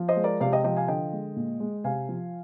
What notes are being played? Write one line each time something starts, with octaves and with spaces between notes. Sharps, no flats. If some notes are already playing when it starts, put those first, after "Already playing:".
Already playing: F3
C5 D#5
G#3
A#4 D5
C3 D5 F5
D#5 G5
F3 D#5 G5
F5 G#5
D3 D#5 G5
G#3
A#2
G#3
C3 F5 G#5
F3